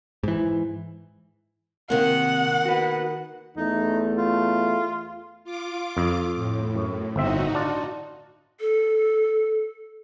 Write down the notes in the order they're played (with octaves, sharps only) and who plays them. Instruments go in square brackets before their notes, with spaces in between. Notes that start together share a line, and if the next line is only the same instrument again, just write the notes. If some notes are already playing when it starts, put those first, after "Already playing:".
[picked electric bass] G#2 E3
[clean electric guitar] C3 [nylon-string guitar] D#3 A#3 [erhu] F#5
[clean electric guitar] F#4 B4
[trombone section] E2 A3 [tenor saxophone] D#4
[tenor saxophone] F4
[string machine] F4 D6
[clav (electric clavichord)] F2
[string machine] A2
[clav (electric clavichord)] F#2
[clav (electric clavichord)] G1 C4 E5 [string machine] D#4 F#4
[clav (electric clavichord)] D4 F4 D5
[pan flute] A4